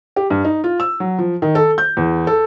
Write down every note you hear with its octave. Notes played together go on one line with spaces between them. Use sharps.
G4
G2
D#4
F4
E6
F#3
F3
D#3
A4
G6
E2
A4